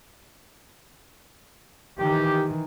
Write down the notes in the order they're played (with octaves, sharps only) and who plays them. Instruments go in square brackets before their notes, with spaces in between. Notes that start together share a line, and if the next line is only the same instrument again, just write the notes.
[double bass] D#3 E3 [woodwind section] G4